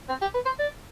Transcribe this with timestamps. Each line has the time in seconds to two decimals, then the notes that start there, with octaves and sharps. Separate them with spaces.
0.09 C4
0.22 G4
0.34 B4
0.46 C5
0.59 D5